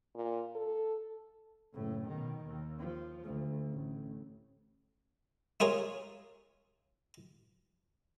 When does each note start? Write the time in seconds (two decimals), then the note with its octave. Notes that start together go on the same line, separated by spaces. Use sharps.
0.15 A#2
0.55 A4
1.74 F#1 A2
2.08 B2 D#3
2.47 D#2
2.79 F3
3.24 D2
3.72 A1
5.60 E4 F4 G#4 A#4 C#5